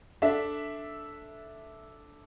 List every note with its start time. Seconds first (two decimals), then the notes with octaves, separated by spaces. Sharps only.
0.22 D4 A4 E5